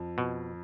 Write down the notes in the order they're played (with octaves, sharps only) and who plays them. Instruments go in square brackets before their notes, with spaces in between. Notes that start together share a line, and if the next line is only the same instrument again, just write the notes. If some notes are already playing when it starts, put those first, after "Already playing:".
Already playing: [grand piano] F2
[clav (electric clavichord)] B2